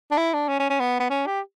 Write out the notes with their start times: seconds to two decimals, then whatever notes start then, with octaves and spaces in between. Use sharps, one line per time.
0.11 D4
0.17 E4
0.34 D4
0.48 C#4
0.59 C#4
0.70 C#4
0.80 B3
1.00 B3
1.10 C#4
1.26 G4